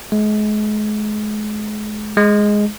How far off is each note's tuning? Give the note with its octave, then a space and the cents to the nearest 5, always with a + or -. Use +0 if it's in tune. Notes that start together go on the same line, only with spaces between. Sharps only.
G#3 +35
G#3 +0